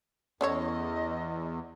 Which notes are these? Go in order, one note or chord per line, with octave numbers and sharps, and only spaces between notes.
E2 C#4 A4 C#5 D#5